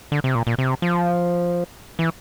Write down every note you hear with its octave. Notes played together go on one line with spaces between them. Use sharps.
D3
C3
A#2
A#2
C3
F3
E3